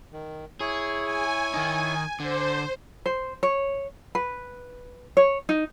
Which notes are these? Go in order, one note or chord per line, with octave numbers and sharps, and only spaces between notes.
D#3
E4 G#4 C#5
G#5
D#3 D#4 G#5
D3 C5
C5
C#5
B4
C#5
D#4